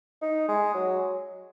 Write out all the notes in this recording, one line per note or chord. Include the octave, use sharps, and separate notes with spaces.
D#4
G#3
F#3